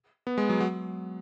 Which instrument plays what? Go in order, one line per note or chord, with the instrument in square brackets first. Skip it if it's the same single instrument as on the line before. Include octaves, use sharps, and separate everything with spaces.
[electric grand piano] B3
G#3
F#3
F#3